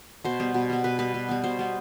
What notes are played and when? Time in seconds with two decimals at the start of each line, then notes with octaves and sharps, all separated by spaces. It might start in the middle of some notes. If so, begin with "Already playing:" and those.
0.25 B2 C5
0.40 G3 B3
0.54 B2
0.70 G3 B3
0.84 B2 B4
0.99 G3 B3 B4
1.14 B2
1.29 G3 B3
1.44 B2 C5
1.59 G3 B3